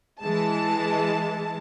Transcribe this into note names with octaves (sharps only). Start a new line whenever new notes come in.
E3 G#3 A5